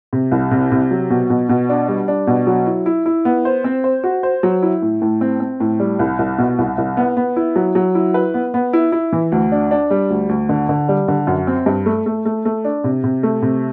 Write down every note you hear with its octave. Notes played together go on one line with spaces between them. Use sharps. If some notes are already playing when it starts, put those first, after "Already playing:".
C3
C2
C3
C3
F#3
B2
B2
B2
D4
G3
D4
B2
F#3
E4
E4
E4
B3
C5
C4
C5
F#4
C5
F#3
E4
A2
A2
C4
C4
A2
G3
C2
C2
B2
C2
C2
B3
B3
E4
F#3
F#3
E4
B4
B3
B3
E4
E4
E3
D2
D4
D4
G3
D2
D2
D3
D3
G3
D3
F#2
C4
G2
A3
A3
A3
A3
D4
C3
C3
A3
C3